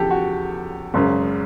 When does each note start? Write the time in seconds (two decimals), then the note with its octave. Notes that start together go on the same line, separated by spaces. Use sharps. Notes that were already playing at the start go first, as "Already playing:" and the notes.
Already playing: E2 C#3 F3 G4 A4
0.11 F#4
0.94 G#1 F#2 C#3